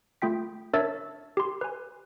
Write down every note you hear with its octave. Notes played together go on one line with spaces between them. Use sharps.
A3 F4 G5 B6
D4 A#4 C#5 E5 E6 A6
G4 C6
B4 G#5